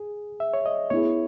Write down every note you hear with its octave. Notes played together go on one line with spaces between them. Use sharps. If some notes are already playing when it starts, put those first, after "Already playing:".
Already playing: G#4
E5
C#5
D#5
B3 E4 G#4 C#5